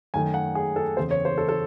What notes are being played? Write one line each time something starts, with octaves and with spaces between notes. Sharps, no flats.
F#2 D#3 A3 G#5
F#5
G#4
A4
F#1 E2 C#3 C5
C#5
C5
A4
A4